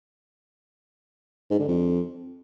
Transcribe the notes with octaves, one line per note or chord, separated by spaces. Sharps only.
G#2
D3
F2